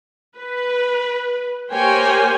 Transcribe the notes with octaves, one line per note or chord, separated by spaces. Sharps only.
B4
A#3 G4 C5 C#5 G5 G#5